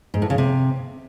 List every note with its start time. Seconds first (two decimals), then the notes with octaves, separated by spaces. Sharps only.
0.14 G#2
0.22 A2
0.30 C#3
0.38 C3